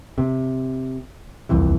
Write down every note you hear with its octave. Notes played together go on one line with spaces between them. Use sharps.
C3
D#1 C2 F2 E3